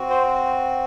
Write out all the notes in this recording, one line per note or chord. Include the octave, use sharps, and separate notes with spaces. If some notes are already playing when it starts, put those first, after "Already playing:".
Already playing: C4 F#4
C5